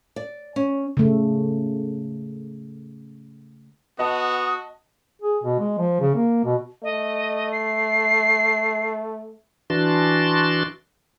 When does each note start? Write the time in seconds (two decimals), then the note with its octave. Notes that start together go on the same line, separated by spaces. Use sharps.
0.16 D5
0.56 C#4
0.97 C#3 A3
3.99 B3 F#4 D#5 A5 D#6
5.22 G#4
5.44 B2
5.59 G#3
5.78 F3
6.01 C#3
6.15 A#3
6.45 B2
6.83 A3 D#5
7.51 C7
9.70 E3 D4 F#4 A5 C6